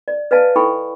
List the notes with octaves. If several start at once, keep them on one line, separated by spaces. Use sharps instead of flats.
D5
B4 D5 D#5 F5 G#5 A5
E4 A4 G5 G#5 B5 C#6